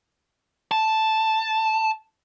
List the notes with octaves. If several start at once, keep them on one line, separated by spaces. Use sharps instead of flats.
A5